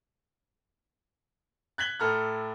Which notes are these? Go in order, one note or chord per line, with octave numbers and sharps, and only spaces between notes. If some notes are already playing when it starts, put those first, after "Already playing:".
F#6 G#6 B6 F#7 G7
A2 A4 A#5 F6